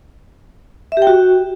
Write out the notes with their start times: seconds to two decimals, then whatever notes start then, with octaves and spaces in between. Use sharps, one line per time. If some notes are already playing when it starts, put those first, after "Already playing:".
0.92 E5
0.97 G4
1.02 G5
1.07 F#4